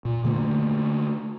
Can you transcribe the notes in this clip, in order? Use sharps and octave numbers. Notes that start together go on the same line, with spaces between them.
A#2
D3 A3 A#3